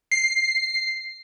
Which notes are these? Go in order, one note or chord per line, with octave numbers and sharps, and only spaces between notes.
C7